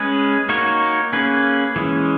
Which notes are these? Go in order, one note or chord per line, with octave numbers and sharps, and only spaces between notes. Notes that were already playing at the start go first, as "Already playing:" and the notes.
Already playing: G#3 C#4 G#4 B4
A#3 D#4 F#4 A#4 C#5
A#3 C#4 G#4 B4
E3 G#3 C#4